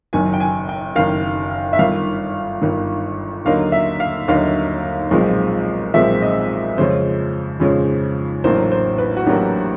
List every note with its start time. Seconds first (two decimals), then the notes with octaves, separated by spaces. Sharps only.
0.13 F#1 F#2 D#3 G#5
0.34 G5
0.40 G#5
0.69 G5
0.95 F#1 F#2 D#3 F5
1.73 E5
1.79 G1 G2 D#3 F5
2.62 G1 G2 D#3
3.45 D#2 D3 F#3 A#3 D#4 F5
3.72 E5
4.00 F5
4.28 D#2 D3 F#3 A#3 D#4 F5
5.11 B1 A#2 F3 G#3 C4
5.94 B1 A#2 F3 G#3 C4 E5
6.22 D#5
6.77 F2 C#3 F3 G#3 C#4 C5
7.60 F2 C#3 F3 G#3 C#4
8.44 A1 A2 F#3 A#3 D4 C5
8.72 C5
8.98 B4
9.17 F#4
9.26 A1 A2 F#3 A#3 D4 G4